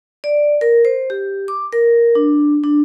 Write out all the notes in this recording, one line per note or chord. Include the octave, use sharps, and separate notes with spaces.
D5
A#4
C5
G4
D6
A#4
D4
D4